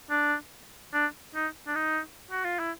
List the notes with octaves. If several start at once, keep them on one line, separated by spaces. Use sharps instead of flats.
D4
D4
D#4
D4
D#4
F#4
F4
E4